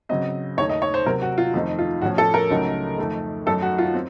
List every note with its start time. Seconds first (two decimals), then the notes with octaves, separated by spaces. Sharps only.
0.09 C#3 F#3 C4 D#5
0.57 D#2 D#3 A3 D#4 C#5
0.69 D#5
0.82 C#5
0.94 C5
1.06 C3 F#3 C4 A#4
1.22 F#4
1.38 F4
1.54 F2 D#3 A3 C4 D#4
1.79 F4
2.01 A2 F3 A3 C#4 F#4
2.18 A4
2.34 A#4
2.50 C#2 C#3 F#3 A3 D#4
2.98 F2 D#3 A3
3.46 F#2 D#3 A3 D#4 A4
3.62 F#4
3.78 F4
3.94 C4